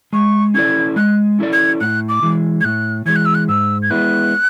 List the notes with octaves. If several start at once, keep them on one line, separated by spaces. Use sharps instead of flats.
G#3 C#6
C#4 E4 A4 D5 G#6
G#3 F#6
C#4 E4 A4 D5
G#6
A2 F#6
D6
E3 G#3
G#6
A2 F#6
E3 G#3 G#6
F#6
E6
F#6
G#2 E6
G#6
G#3 B3 E4 F#6